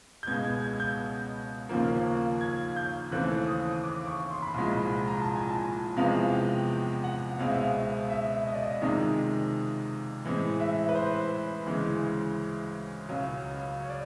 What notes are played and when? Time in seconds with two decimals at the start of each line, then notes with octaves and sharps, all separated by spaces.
0.23 G6
0.27 C#2 B2 G#3 B3 G#6
0.45 G#6
0.63 G#6
0.80 G6
1.69 D#2 C#3 F3 A#3
2.41 G#6
2.76 G6
3.12 D#2 C#3 E3 A3 C4 F#6
3.47 D#6
3.83 D6
4.07 C#6
4.30 C6
4.42 B5
4.54 C2 A#2 F3 G#3 C6
4.72 B5
5.08 A#5
5.22 A5
5.36 G#5
5.49 A5
5.97 E2 C3 F3 G#3 B3 F5
6.33 G5
6.68 G5
7.04 F#5
7.39 C#2 B2 G#3 C4 F5
7.50 E5
7.61 F5
8.10 E5
8.46 D#5
8.54 D5
8.62 D#5
8.82 F2 C3 D#3 G#3
10.25 A2 E3 G#3 C4
10.60 E5
10.89 B4
10.95 C5
11.66 D2 C#3 E3 G#3
13.09 C#2 C#3 F#3
13.80 C#5
13.90 D5